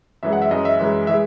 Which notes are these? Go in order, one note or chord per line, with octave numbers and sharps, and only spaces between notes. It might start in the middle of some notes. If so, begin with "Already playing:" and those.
F#2 E3 G#3 E5
F#5
E5
F#2 E3 G#3 D#5
E5
F#2 E3 G#3
E3 G#3 E5